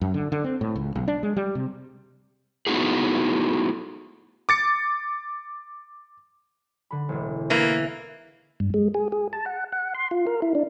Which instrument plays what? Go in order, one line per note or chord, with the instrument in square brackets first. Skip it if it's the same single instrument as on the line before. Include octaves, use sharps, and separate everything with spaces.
[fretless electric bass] F#2
D3
D3
C4
A2
C#2
B1
D4
G#3
G3
C3
[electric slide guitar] A3 B3 D#4 E4 F#4 G#4
[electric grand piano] D6 A6 C#7
[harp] D3 B5
E1 A1
[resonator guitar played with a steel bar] E3 [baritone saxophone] A#3
[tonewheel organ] G2
G#3
G#4
G#4
A5
F#5
F#5
C6
F4
A#4
E4
D4